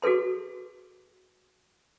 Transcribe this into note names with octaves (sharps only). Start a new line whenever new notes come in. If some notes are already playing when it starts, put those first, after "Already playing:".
F#4 G#4 A4 B4 C6